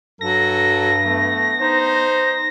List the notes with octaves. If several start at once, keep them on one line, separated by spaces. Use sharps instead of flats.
G2 F#3 A4 A#6
A3 B3
D#4 C5